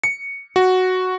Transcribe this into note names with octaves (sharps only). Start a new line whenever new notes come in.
C#7
F#4